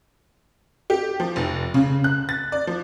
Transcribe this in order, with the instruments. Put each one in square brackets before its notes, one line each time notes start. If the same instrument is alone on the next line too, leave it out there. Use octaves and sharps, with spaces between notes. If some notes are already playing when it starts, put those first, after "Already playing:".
[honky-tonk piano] G4
F3
F1
C#3
F#6
A6
D5
F3